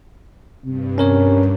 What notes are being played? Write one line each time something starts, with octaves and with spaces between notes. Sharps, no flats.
G2 C3
C#4 A#4 C#5